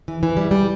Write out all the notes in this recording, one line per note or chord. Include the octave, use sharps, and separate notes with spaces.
E3
E3
G3
G3